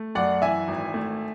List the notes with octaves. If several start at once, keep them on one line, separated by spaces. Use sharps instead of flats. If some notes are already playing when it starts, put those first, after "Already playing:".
Already playing: A3
F#2 D5 F#5
E3 E5 G#5
G#1
A3